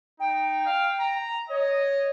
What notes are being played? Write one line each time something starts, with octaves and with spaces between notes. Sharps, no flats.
D#4 G5
F5
A#5
C#5 D#5